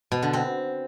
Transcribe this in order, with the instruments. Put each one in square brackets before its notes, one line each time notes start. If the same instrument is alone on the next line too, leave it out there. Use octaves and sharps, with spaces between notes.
[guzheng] B2
D3
C4